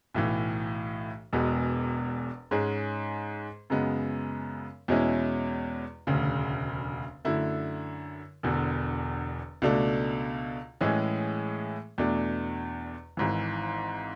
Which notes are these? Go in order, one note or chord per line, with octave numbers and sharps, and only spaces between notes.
B1 A2 E3
E1 E2 B2 G#3 B3
G#2 G#3 C#4 G#4
F#2 C#3 G#3 B3
E2 B2 G#3 C#4 E4
E1 D2 C#3
F#2 D3 A3 E4
E1 E2 D3
C#2 B2 A3 D4 A4
A2 E3 G#3 C#4 G#4
E2 B2 A3 D4
G#1 G#2 E3